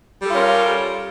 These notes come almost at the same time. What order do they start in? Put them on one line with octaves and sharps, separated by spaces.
G3 A4 F4 C#4 A#4